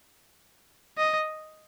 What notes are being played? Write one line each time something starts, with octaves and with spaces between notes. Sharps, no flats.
D#5